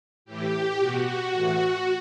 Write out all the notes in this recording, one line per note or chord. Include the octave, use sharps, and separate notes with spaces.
A2 E3 G4
B2 F#4
A2 E3